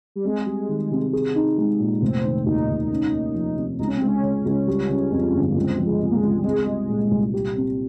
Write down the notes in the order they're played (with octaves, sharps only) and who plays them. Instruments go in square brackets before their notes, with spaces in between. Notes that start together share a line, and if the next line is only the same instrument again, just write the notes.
[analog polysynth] G3
[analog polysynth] G#3 [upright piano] C4
[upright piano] G3
D#3
C3
G#4
D#4
G#3
A#2
[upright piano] F1 [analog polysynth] C4
[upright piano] D#3
[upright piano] D#2 [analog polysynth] D#4
[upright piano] F1
C#4
A#3
F3
C3
[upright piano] C#2 [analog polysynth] D#4
[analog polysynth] C#4
C4
[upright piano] G#3
[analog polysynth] C#4
[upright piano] C#3
C#2
G3
C#3
F2
G1
[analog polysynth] A#3
[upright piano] C#2 [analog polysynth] C4
[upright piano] F3
[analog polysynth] G#3
[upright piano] C3
[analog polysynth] A#3
G#3
[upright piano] C#2
[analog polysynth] G3
[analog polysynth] G#3 [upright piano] C4
[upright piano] G3
A#2
C2
G4
C4